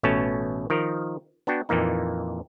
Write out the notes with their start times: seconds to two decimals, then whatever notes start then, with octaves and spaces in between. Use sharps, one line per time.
0.03 A1 B2 A3 C#4 C#5 A5
0.70 D#3 F3 A#4
1.47 B3 D4 F#4 G5
1.69 F2 A#2 E3 A#3 D#4